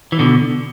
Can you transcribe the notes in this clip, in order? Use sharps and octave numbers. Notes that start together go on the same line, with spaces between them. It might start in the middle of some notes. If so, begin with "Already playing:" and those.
E3
B2 D3